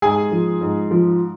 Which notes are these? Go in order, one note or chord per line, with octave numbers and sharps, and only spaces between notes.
G#2 G#4 G#5
F3
G#2
F3